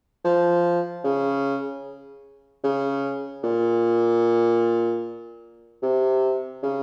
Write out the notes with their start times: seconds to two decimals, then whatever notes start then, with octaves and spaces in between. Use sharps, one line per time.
0.25 F3
1.04 C#3
2.64 C#3
3.44 A#2
5.83 C3
6.63 C#3